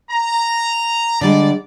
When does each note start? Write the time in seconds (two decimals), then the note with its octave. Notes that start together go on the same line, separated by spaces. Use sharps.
0.11 A#5
1.21 D3 G3 G#3 D5